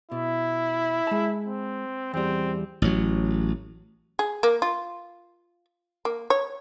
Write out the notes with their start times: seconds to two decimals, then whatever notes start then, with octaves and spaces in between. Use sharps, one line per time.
0.12 B2 E4
1.07 G#3 A5
1.46 C4
2.14 E2 G3 C4
2.82 A1 F#3
4.19 G#4
4.43 A#3
4.62 F4
6.05 A#3
6.30 C#5